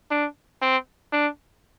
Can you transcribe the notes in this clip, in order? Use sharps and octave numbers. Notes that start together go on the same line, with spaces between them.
D4
C4
D4